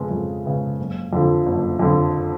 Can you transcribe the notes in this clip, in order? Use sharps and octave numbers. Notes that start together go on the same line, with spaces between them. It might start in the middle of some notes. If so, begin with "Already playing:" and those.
Already playing: F2 C#3 G#3 B3
F2
C#3 G#3 B3
F#1
F2 D3 F3
F#1
F2 D3 F3